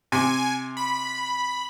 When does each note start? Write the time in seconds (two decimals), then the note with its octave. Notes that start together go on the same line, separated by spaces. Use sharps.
0.12 C3 G#5
0.77 B5